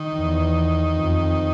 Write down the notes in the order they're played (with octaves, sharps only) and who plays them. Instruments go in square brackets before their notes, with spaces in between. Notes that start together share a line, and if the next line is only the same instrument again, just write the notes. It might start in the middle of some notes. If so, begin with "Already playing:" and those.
Already playing: [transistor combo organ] D#3
[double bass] E2
F2